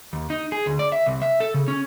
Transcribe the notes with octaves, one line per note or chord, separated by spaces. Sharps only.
D#2
D#4
G#4
D2
D5
E5
C2
E5
A4
C#3
C#4